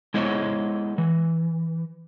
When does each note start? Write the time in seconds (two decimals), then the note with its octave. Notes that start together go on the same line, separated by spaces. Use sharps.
0.14 G#3 B3 E4 C5 C#5 D#5
0.98 E3